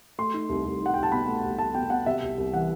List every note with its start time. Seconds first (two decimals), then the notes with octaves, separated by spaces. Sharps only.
0.18 A3 C6
0.34 D#4
0.49 C2
0.65 C2
0.81 D#4 F#5
0.94 C2 G5
1.03 A5
1.12 B2 B5
1.28 A3
1.44 C2
1.58 A3 A5
1.75 B2 G5
1.90 B2 F#5
2.06 C3 E5
2.22 C2
2.38 C2
2.53 E3 F#5